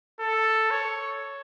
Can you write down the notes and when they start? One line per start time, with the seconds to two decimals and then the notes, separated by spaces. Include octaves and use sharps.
0.20 A4
0.70 C#5